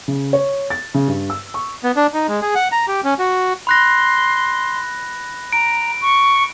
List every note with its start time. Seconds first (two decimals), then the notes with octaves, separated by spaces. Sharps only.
0.08 C#3
0.33 C#5
0.70 A6
0.94 C#3
1.08 G2
1.30 E6
1.54 C#6
1.84 B3
1.96 D4
2.14 D#4
2.28 G#3
2.42 G#4
2.55 F#5
2.72 A#5
2.88 G4
3.04 C#4
3.19 F#4
3.67 B5 C6 F#6 A#6
5.53 A#5 D7
6.01 C#6